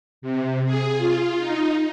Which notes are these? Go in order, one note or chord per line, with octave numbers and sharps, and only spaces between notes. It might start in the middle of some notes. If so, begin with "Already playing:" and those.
C3
G#4
F4
D#4